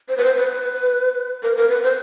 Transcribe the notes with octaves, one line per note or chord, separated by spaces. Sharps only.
C5
B4
C5
B4
A#4
A#4
B4
C5